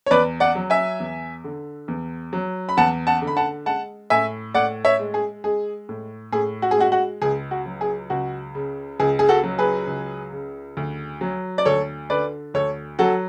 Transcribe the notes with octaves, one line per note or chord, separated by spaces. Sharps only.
C#5
E2 B4 D5
D5 F#5
F#3
E5 G#5
E2
D3
E2
F#3
B5
E2 F#5 A5
F#5 A5
D3
B5
F#5 A5
G#3 F#5 A5
A2 E5 G#5
A2 D5 F#5
C#5 E5
G#3
G#4
G#3 G#4
A2
A2 G#4
F#4
G#4
G#3 F#4
F#4
C#2 G#4
F#4
F#3
G#4
C#2 F#4
C#3
C#2 G#4
G#4
F#4 A4
F#3
G#4 B4
C#2
C#3
D2
F#3
D5
D2 A4 C#5
D3 B4 D5
D2 A4 C#5
F#3 F#4 A4